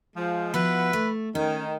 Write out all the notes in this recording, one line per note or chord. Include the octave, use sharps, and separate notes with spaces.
F3 G#3
F3 B3 F#4 B4 E5 B5
A3
D#3 C#4